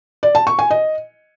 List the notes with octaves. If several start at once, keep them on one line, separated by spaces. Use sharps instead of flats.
D5
A5
C#6
G#5
D#5